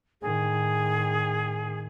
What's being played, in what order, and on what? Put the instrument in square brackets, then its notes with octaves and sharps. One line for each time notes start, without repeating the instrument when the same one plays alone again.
[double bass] A2 D#3 [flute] G#4